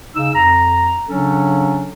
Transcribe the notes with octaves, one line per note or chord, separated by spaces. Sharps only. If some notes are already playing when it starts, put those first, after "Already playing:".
C#3 D#4 E6
F2 A#5
C#3 F#3 C#4 D4 A4